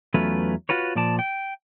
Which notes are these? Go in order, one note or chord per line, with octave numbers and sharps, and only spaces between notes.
E2 F#3 A3 C#4 F4 B4
F4 F#4 B4 C#5
A#2 F3 D5 A5
G5